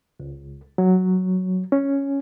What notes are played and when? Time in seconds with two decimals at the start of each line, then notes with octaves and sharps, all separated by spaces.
0.20 C#2
0.78 F#3
1.72 C#4